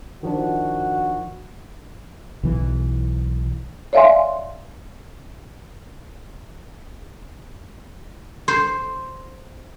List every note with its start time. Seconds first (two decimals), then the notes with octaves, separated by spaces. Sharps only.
0.23 D#3 F3 D4 F#4
2.43 B1 E3
3.93 C#5 D5 E5 F5 G#5 C6
8.48 C5